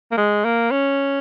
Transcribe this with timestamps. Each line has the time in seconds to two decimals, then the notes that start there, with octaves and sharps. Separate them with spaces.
0.12 A#3
0.17 G#3
0.45 A#3
0.71 C#4